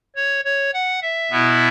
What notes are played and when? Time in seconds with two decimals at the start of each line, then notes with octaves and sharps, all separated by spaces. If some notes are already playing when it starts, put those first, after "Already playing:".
0.16 C#5
0.45 C#5
0.74 F#5
1.02 E5
1.31 B2 B3 E4